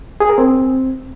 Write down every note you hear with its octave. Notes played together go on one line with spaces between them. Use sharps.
G#4
A#4
C4